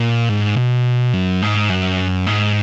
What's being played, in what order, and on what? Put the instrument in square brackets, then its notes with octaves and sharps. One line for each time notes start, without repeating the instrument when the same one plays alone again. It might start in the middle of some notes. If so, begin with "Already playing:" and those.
Already playing: [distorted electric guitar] A#2
G#2
B2
F#2
G#2
F#2
G#2